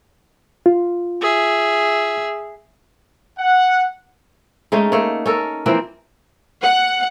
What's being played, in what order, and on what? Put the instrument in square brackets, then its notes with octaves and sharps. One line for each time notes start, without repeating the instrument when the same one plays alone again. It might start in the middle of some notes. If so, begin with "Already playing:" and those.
[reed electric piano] F4
[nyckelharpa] G#4 E5
[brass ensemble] F#5
[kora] G#3 A3 C#4 D#4
A3 A#3 C#5
C#4 A4 A#4
E3 F3 A#3 C4
[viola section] F#5